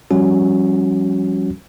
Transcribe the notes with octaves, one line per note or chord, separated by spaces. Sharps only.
F3 G3 C#4 F#4